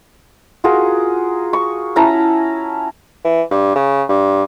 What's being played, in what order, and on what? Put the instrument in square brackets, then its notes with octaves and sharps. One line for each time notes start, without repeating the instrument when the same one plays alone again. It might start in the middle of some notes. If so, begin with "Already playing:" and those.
[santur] F4 F#4 G#4 A#4
C#6
C#4 E4 A5 A#5
[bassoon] E3
G2
C#3
G2